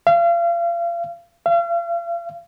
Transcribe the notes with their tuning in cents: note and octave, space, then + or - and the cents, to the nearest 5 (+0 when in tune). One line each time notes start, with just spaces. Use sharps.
F5 -35
F5 -40